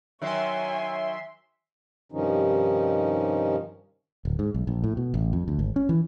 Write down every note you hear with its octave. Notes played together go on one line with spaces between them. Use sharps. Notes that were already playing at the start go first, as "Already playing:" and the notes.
D#3 F#3 C#5 E5 G#5 C6
G2 C3 D#3 F3 C#4 D#4
D1
G#2
B1
A#1
A2
B2
A1
F2
D2
G#1
C#4
E3